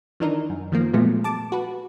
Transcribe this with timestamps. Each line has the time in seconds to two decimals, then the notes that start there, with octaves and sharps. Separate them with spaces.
0.20 D#3 E3 D4 D#4 A#4
0.50 F#2
0.72 D#3 F3 A#3
0.93 A#2 F3 F#3 G#3 A3 B3
1.24 A5 D6
1.52 F#4 B4